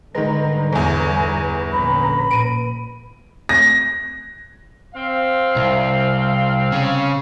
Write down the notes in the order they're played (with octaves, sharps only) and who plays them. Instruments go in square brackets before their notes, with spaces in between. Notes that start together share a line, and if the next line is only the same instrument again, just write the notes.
[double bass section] G#2 D3 G3 [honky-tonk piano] D#3 G#3 [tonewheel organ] B4 A#5
[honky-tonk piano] G1 E2 [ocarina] G#5
[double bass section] A#1 D3 C#4 [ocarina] B5
[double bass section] A#2 [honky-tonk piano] D7 D#7
[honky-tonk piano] A#6
[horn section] C4 F5
[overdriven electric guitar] C2
C#3